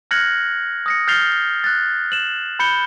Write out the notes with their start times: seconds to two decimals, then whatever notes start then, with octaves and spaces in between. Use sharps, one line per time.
0.11 F6 F#6 G#6 A#6 C#7 F#7
0.86 D#6 A#6 C#7
1.08 F6 G6 A6 C7 F7 G7
1.64 F#6 A6
2.12 E7 F#7
2.59 B5 G6 C#7 G7